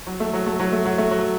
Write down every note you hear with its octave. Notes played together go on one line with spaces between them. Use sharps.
F#3
A3
F#3
A3
F#3
A3
F#3
A3
F#3